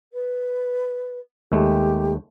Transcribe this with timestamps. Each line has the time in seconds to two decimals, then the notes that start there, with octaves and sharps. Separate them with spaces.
0.13 B4
1.52 D#2 G#3 A3 G4